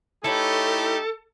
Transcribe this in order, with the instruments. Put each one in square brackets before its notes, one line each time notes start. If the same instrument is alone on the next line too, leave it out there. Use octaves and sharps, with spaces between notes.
[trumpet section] A3 D#4 G4 [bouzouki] E4 B4 C#5 [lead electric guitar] A4